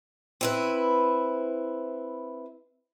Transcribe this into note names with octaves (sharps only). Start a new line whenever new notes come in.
C4 E4 B4